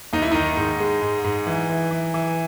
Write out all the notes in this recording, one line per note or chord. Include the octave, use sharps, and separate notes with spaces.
D#2 D#4
E4
D#3 D#4
G#2
G#3
G#2
G#2
E3
E3
E3
E3